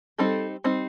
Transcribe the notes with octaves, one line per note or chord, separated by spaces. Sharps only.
G3 C4 D#4 A4
G3 C4 D#4